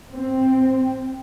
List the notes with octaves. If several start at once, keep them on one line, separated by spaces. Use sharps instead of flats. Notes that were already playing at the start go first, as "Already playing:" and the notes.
C4